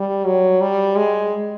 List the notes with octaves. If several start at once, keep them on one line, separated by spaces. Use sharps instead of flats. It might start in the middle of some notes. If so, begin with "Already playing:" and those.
Already playing: G3
F#3
G3
G#3